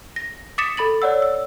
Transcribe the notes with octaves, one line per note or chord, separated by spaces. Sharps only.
A#6
D6 D#6 A6 B6 C#7 E7
A4 B5 A6 F#7
C#5 D5 F#5 E6
E6